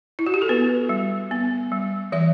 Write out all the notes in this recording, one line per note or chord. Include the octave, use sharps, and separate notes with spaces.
E4
F#4
G4
A4
B3 B4
G3
B3
G3
E3 E5